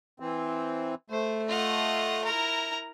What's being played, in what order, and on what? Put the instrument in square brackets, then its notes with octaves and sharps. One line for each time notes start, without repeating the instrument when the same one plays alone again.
[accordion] E3 C4
[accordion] A3 [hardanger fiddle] C5
[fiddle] F4 F#5 [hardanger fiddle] D#5
[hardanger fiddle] E4 A#4 [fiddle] A#5